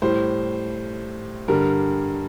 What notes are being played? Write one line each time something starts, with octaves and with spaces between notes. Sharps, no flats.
A2 G3 C5
G2 D3 G3 A#4